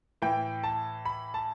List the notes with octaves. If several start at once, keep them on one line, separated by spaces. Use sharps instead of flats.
A2 E3 G5
A5
B5
A5